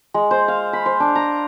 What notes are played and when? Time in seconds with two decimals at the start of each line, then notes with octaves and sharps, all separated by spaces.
0.14 G#3
0.31 C5
0.48 F5
0.73 B5
0.86 C5
1.00 D4
1.15 A#5